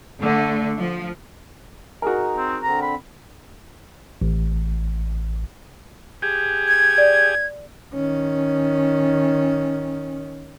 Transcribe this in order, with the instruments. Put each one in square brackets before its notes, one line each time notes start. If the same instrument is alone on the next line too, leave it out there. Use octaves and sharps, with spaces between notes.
[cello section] D3 A3
F3
[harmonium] D#4 [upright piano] F#4 G#4 A#4
[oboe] C4
[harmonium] D3 C4 [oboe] A#5
[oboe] B5
[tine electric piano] A1
[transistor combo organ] G4 G#4
[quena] G#6
[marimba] D5
[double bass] D#3 C#4